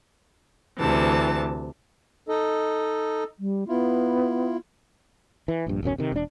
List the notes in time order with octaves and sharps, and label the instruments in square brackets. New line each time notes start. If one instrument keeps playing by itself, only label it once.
[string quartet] D2 C3 E3 A5
[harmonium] D#4 A4 D#5
[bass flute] G3
[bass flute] B3 [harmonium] E4 F4
[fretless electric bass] E3
A#1 G2
D1 B1 F#2 C#4
C3 D#3
E1 D4